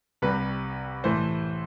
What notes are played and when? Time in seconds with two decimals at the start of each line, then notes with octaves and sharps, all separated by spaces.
0.22 C2 C3 G3 B4
1.04 A2 E3 A3 C5